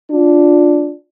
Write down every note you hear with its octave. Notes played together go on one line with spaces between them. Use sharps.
D4 F4